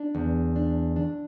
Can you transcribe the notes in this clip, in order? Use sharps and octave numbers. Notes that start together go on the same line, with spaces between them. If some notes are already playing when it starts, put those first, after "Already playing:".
Already playing: D4
E2
D4
D4